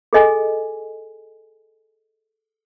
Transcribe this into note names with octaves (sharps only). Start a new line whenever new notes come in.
G#4 A4 D#5 G#5